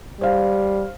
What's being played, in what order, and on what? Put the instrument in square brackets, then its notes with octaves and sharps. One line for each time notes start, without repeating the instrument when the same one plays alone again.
[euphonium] G3 [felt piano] C5 F5